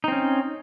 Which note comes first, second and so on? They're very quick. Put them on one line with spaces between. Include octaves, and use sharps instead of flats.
D#4 C4 C#4